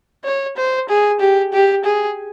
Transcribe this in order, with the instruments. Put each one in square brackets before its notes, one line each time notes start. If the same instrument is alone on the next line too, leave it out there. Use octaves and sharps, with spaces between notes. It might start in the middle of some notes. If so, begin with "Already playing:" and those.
[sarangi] C#5
C5
G#4
G4
G4
G#4